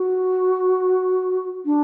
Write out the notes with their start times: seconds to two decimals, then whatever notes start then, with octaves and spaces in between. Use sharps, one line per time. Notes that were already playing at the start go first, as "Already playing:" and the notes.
Already playing: F#4
1.65 D4